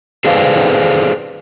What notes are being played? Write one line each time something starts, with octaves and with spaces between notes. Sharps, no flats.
G#4 A4 B4 C5 D5 F5